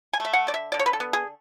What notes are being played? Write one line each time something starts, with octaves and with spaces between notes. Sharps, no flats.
G#5
A3 E5
F#5
D3 D5
E5
D3 D5
C#5
B4
A4
B3
G#4